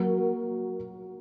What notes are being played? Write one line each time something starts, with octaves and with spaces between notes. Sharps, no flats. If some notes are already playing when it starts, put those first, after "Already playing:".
Already playing: F#3 A#3 F#4 A#4